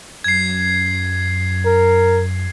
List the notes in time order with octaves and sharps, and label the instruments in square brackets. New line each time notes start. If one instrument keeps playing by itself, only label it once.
[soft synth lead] F#2 [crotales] G#6 C7
[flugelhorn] A#4